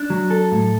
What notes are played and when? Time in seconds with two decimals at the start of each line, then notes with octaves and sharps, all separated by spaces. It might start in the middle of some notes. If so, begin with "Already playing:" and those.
Already playing: D4
0.10 F#3
0.30 A4
0.52 A2